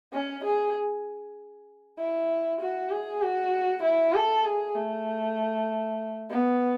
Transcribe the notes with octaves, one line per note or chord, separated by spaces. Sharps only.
C#4
G#4
E4
F#4
G#4
F#4
E4
A4
G#4
A3
B3